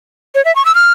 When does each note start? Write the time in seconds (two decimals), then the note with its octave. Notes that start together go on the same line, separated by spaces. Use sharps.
0.35 C#5
0.45 E5
0.56 C#6
0.65 E6
0.75 F6